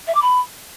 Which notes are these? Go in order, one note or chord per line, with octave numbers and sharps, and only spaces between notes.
E5
D6
B5